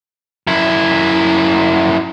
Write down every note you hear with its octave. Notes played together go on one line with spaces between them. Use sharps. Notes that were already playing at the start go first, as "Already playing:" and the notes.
F#2 E4